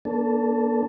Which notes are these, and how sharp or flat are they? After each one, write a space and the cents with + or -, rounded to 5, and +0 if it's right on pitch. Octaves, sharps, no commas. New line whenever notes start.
A#3 +35 D4 -35 A4 +0